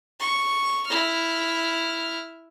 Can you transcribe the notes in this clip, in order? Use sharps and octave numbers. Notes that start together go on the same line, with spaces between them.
C#6
E4 F6